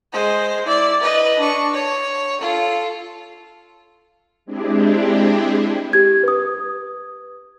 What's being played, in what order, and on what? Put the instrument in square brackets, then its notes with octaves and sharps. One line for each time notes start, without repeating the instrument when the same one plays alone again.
[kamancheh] G#3 C5
E4 D5
B4 D#5
D4 C#6
C#5
F4 A4
[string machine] G#3 C4 D4 E4 G4 G#4
[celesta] G4 G#6
B4 D#6